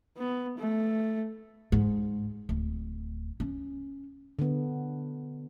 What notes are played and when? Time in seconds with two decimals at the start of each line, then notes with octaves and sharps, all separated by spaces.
0.18 B3
0.58 A3
1.72 G#2
2.49 D1
3.40 C#4
4.39 D3 B3